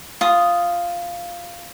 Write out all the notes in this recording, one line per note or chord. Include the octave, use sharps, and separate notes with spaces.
F4 D#6